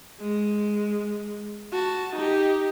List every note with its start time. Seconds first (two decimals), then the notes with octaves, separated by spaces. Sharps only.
0.20 G#3
1.73 F#4 A5
2.16 D#4 G4